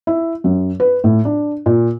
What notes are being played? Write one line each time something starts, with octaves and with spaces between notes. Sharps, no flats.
E4
F#2
B4
A2
D4
A#2